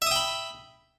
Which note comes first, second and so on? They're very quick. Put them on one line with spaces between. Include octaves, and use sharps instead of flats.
E5 D#6 G5 B5